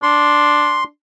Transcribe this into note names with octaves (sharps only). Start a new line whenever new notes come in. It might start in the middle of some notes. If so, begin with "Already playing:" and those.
D4 C6